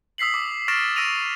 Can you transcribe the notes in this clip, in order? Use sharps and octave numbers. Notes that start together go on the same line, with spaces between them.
D#6 E6 B6 C7 F#7
D6
C#6 F6 A6 A#6 D7 E7
D#6 E6 A#6 D7 D#7 F7